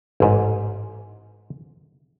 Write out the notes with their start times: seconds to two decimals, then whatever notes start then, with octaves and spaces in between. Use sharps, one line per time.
0.20 A1 G#2